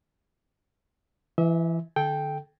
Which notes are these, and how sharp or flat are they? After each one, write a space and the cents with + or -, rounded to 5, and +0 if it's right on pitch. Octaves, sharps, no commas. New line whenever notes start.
E3 +20 E5 -35
D3 +20 A4 -25 G5 +0